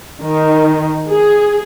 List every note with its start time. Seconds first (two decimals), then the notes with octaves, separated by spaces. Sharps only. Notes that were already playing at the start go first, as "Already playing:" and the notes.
0.23 D#3
1.09 G#4